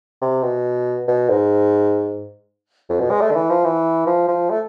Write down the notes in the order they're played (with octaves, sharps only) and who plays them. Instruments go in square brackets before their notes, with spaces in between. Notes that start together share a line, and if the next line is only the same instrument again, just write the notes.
[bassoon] C3
B2
B2
G#2
F2
B2
G#3
A3
D3
E3
F3
E3
F3
F3
A3